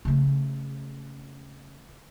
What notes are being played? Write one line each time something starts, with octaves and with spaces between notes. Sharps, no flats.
C#3 A3